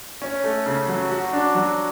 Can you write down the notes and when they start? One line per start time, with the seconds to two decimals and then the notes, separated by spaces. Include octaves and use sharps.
0.22 C#4
0.44 A3
0.66 C#3
0.88 F#3
1.11 F#4
1.33 D4
1.55 F#3